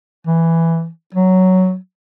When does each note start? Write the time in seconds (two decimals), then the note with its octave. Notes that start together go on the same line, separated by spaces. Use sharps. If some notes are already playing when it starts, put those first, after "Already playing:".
0.27 E3
1.15 F#3